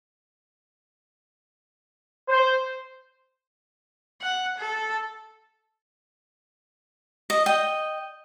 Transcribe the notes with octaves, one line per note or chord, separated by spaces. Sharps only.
C5
F#5
A4
D#5
D#5 G5